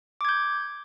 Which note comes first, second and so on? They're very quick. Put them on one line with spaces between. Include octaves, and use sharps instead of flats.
D6 G#6 G6